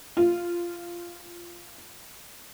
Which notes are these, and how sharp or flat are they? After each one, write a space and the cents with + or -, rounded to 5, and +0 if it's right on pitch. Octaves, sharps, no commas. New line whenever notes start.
F4 -10